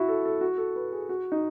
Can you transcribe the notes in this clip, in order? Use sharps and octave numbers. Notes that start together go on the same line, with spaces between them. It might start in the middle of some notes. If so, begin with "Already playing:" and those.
Already playing: E4 F#4
A4
A4
F#4
A4
B4
G#4
F#4
D#4